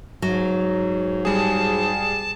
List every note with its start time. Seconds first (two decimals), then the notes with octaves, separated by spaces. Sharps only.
0.22 G#2 F#3
1.25 G3 G#4 A5